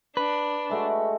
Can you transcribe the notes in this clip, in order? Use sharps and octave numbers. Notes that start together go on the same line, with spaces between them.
D4 B4
G#3 A3 F#4